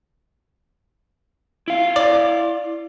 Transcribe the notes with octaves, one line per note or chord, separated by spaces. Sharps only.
E4 F5
D5